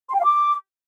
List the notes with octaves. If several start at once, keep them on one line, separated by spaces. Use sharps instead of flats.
C6
G5
F5
D6